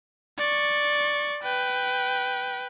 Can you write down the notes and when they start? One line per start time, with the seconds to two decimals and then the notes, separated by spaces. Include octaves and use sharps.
0.38 D5 C#6
1.43 B4 G5